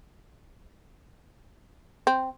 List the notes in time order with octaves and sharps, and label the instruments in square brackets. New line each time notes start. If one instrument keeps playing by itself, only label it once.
[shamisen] C4